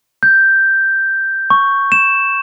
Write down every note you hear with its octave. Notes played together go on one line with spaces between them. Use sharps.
G6
C#6
E7